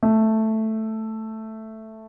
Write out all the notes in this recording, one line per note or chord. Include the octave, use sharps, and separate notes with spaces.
A3